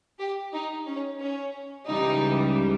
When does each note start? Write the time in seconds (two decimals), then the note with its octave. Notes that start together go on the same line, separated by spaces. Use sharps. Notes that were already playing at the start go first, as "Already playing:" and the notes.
0.20 G4
0.53 D#4
0.87 C#4
1.20 C#4
1.87 C#2 C#3 E3 G3 D#4